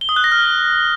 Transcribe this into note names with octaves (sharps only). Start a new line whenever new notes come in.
G7
D#6
F#6
A#6
F6